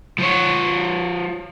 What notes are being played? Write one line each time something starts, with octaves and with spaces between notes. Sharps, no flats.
F3 C#5